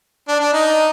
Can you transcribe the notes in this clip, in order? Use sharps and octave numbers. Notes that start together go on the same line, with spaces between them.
D4
D4
D#4